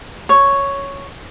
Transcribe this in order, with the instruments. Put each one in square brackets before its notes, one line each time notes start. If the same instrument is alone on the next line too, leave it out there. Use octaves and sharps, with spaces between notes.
[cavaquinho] C#5